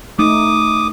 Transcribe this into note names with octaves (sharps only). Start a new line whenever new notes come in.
A3 D#4 D6 D#6